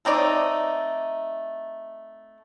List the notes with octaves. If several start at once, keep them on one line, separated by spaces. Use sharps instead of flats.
A3 C4 D#4 D5